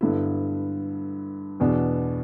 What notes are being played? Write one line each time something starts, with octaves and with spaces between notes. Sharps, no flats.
G2 D3 B3 E4
E2 B2 B3 D4